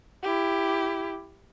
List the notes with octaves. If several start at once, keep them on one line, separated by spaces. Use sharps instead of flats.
E4 G4